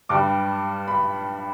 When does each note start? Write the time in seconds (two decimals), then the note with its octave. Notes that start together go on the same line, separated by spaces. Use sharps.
0.09 G2 G3 D6
0.88 B5